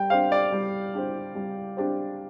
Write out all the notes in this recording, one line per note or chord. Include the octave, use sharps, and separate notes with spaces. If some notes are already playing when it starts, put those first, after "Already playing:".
Already playing: G3 G5
D4 G4 C5 F5
D5
G3
D4 G4 C5
G3
D4 G4 C5